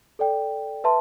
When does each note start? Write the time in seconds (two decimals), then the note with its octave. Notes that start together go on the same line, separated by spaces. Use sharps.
0.19 A4 D5 G5
0.84 B4 E5 A5 C6